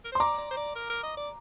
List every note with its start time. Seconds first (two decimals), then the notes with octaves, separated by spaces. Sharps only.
0.05 A#4
0.12 C5
0.15 C6
0.20 D5 A#5 D6
0.38 D5
0.51 C5
0.57 D5
0.75 A#4
0.90 A#4
1.03 D#5
1.17 D5